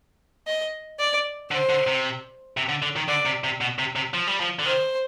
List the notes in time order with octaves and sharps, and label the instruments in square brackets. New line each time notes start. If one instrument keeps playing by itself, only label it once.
[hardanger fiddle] D#5
D5
[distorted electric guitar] D3 [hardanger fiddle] C5
[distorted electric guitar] D3
C3
C3
D3
D3
D#3
[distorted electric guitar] D3 [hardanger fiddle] D5
[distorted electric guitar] C3
C3
B2
C3
C3
F3
G3
F3
D3
[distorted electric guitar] D#3 [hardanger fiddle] C5